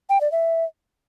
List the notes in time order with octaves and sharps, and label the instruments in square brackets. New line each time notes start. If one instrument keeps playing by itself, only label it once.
[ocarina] G5
D5
E5